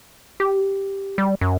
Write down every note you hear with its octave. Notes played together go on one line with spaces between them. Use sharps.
G4
G3
F#2